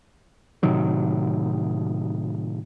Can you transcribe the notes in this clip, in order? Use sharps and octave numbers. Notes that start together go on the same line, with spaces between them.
A2 C3 D#3 F#3